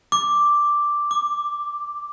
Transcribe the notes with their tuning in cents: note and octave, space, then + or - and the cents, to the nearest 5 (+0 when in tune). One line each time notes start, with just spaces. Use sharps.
D6 +0
D6 +20